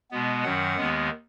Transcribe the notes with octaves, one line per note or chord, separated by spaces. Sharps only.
B2 G#3 B3
F#2 D#3 F#3 F#5
D#2 D#3 G#3 B3